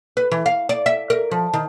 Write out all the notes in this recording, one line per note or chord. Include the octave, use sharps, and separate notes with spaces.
B4
E3
F5
D5
E5
A#4
F3
D#3